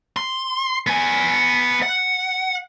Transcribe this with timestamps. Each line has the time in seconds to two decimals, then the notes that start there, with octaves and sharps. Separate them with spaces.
0.17 C6
0.87 B3 G#5
1.83 F#5